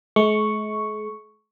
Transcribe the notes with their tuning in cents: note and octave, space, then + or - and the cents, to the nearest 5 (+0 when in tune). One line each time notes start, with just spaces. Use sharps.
G#3 +45 C#6 +0